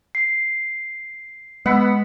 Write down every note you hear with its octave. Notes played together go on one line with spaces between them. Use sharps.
C7
G#3 B3 F#5 B5 E6